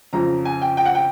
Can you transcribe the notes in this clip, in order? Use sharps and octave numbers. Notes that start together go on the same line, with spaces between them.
F2 C#3 F3 A#5
G#5
G5
G5
F#5
G5